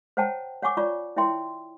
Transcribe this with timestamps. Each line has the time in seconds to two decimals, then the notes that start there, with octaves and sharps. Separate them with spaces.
0.17 C5 C#5 F#5 G5 A5 A#5
0.62 C#5 F#5 G#5 C#6 D6
0.77 F4 C#5 D5 A#5 C#6
1.16 E4 C#5 E5 G5 C6